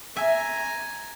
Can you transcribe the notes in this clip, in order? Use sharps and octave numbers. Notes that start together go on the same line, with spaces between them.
E5 G#5 A#5